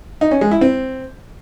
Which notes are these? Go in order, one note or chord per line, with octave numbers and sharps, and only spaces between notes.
D#4
C#4
G#3
E4
C4